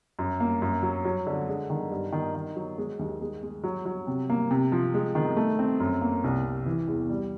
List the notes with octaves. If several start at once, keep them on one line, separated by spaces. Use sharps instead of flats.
F#2
A#3
F#2
F#3
F#3
D3
G#3
D#3
G2
D#3
D#3
F#3
G#3
D#2
G#3
G#3
F#3
F#3
C3
A#3
C3
F3
G#3
D#3
A3
C4
F#2
A#3
C2
C3
E3
E2
G3